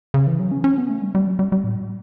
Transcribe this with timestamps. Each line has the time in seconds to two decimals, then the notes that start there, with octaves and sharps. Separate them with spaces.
0.14 C#3
0.27 E3
0.40 F#3
0.52 C#4
0.64 C#4
0.78 B3
0.90 A3
1.02 G3
1.15 G3
1.27 F#3
1.39 G3
1.52 G3
1.64 A2